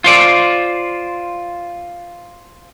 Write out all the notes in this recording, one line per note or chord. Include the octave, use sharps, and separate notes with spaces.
F4 C5 D5